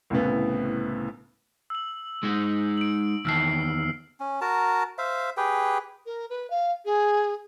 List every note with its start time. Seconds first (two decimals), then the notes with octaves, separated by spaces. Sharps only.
0.10 C2 A2 C#3 B3
1.70 E6 F#7
2.23 G#3 D#4 G#4
2.78 D7 F#7
3.25 E2 D#3 A5 E6 F6 C7
4.20 C#4
4.41 F#4 A#4 A5 A#5
4.98 C5 E5 F5
5.37 G4 G#4 B4 G5
6.06 A#4
6.30 B4
6.50 F5
6.85 G#4